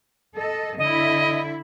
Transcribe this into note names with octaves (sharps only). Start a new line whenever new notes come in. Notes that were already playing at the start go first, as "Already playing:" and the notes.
A4 D#5
D3 E4 D#5